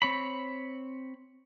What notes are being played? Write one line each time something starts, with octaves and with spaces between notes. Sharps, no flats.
C4 C#5 B5